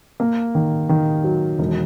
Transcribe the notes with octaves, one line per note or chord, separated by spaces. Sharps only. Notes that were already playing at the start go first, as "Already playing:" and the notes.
A#3
D#3
D#3
F#3
E1